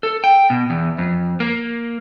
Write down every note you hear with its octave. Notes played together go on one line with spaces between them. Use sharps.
A4
G5
B2
E2
F2
A#3